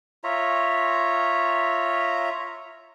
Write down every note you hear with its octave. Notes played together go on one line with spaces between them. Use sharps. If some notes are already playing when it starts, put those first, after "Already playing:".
F4 C#5 E5 A#5